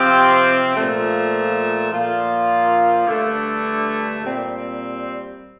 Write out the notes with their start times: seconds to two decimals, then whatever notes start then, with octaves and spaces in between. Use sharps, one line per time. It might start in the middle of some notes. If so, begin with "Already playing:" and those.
Already playing: C3 F3 C4 G4
0.75 A#2 F3 A3
1.90 A#2 F3 A#3 F4
3.06 G2 D3 A3
4.21 A#2 G3 C4